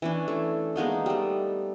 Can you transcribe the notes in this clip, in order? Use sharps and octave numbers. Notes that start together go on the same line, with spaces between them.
E3 C#4 D4
A3
G#3 A#3 B3 D#4
G3 A3